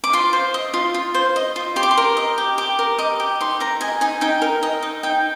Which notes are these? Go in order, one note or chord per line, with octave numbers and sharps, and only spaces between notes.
D6
F4 C6
C5
D#5
F4
F4
C5
D#5
F4
G4 C6
D6
C6
A#4
D#5
G4
G4 D6
A#4
D#5 D6
G4
D#4 C6
A#4 A#5
D#5 G#5
D#4 G#5
D#4 G5
A#4
D#5
D#4
D#4 G5